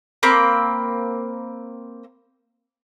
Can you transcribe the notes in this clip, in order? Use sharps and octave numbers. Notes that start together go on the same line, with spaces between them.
A#3 C4 B5